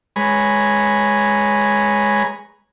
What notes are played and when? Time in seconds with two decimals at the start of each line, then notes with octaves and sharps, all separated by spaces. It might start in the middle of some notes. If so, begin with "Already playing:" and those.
0.16 G#3 B4 C#5 G#5 A#5 B5